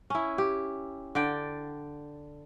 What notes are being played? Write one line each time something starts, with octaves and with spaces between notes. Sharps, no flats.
C#4 E4
G4
D3 D5 G5